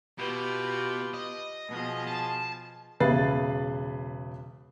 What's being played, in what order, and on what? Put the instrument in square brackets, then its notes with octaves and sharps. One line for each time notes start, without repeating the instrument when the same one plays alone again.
[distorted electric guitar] B2 [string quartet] F4 G4 B4
[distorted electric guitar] D#5
[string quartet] B2 F3 G#4
[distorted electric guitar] A5
[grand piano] E1 C#3 B4 E5 A6 C7